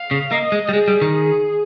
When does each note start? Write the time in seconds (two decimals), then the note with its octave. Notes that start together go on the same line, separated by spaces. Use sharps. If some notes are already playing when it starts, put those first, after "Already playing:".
Already playing: F5
0.11 C#3
0.32 A#3 D#5
0.52 G#3
0.69 G3
0.73 G#3 G#4
0.88 G3
1.02 D#3
1.14 G#4